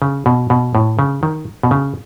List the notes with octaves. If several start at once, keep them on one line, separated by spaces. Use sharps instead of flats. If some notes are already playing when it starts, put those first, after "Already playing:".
C#3
B2
B2
A2
C#3
D#3
B2
C#3